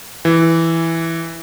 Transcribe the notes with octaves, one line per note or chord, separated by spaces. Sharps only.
E3